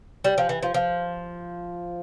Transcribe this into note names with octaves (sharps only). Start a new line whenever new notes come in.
G3
F3
E3
F3
F3